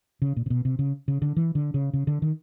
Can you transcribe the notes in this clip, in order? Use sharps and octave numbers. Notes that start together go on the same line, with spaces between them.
C#3
A#2
C3
B2
C3
C#3
C#3
D3
E3
D3
C#3
C#3
D3
D#3